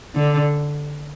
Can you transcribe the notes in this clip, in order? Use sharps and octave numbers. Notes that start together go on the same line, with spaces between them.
D3